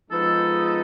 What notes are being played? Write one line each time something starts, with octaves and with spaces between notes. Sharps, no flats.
F3 G#3 B3 D#4 A4
A4